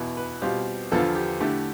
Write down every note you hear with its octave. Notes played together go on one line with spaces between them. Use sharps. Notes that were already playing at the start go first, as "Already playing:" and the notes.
Already playing: E2 B2 B3 E4
B4
B2 G3 C4 F4 G4
E2 D3 F3 B3 F4 A4
G4
D3 A3 E4 G4